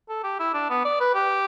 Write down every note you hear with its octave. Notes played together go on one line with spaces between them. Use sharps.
A4
G4
E4
D4
B3
D5
B4
G4